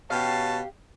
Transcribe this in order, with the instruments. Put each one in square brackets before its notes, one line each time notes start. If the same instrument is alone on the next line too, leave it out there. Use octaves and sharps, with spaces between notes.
[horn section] B2 C#4 A5 [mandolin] G4 F5